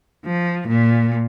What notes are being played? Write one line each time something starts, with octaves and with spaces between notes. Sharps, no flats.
F3
A#2